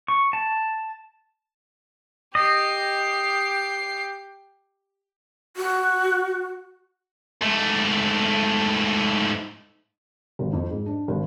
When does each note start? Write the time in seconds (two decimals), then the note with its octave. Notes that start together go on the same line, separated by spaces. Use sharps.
0.08 C#6
0.33 A5
2.35 G4 D#5 C7
5.57 F#4
7.41 G#2 A3
10.39 G#1
10.53 F2
10.71 G#2
10.86 D4
11.08 G#1